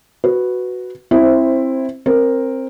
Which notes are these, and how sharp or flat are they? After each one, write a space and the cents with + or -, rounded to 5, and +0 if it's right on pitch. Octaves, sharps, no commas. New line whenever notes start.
F#4 +0 B4 +0
C4 +15 E4 +0 C5 +0
C4 +20 A#4 +0